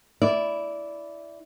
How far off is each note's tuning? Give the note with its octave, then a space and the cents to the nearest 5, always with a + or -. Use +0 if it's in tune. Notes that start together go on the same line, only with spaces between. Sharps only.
E4 +0 D5 -10